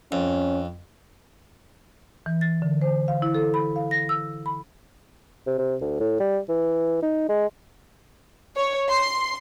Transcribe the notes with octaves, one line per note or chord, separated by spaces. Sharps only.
F2 C#4
E3
A6
D3
C5
F5
E4
A4
B5
F5
A#6
E6
B5
C3
C3
D2
A2
G3
E3
D#4
G#3
C#5
C6